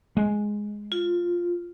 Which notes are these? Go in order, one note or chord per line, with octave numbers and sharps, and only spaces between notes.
G#3
F4